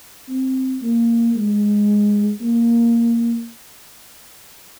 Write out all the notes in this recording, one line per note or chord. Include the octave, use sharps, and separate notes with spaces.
C4
A#3
G#3
A#3